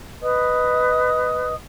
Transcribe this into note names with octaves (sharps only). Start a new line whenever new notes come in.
B4 D#5 D#6